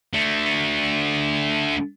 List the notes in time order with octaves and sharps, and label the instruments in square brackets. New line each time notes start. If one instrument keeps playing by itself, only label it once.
[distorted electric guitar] D3 A3